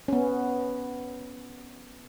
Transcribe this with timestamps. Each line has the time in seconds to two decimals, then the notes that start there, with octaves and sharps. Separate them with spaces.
0.08 B3 C#4